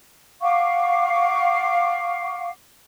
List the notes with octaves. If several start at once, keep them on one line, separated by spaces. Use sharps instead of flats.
F5 F#5 C#6 D6